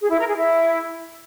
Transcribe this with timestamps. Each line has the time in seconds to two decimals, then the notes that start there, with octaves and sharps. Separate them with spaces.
0.01 G#4
0.09 E4
0.18 A#4
0.27 G#4
0.36 E4